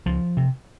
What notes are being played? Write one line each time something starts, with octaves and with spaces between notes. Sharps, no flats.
C#2 F3
C3